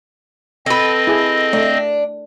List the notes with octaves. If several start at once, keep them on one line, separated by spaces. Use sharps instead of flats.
C4 A4 B4 D#5
E4 G#4
A3 D4